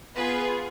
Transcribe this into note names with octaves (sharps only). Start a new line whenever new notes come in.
B3 F4 G#4 B4